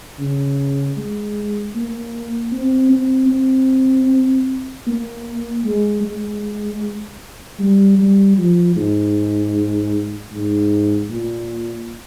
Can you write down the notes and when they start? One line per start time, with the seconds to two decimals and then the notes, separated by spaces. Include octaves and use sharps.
0.19 C#3
0.97 G#3
1.75 A#3
2.52 C4
2.92 C4
3.30 C4
4.87 A#3
5.65 G#3
6.04 G#3
7.59 G3
7.98 G3
8.37 F3
8.76 G#2
10.32 G#2
11.10 A#2